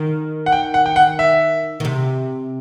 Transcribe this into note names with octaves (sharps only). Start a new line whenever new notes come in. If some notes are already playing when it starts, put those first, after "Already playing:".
Already playing: D#3
F#5
G5
F#5
G5
F#5
E5
D#3
C3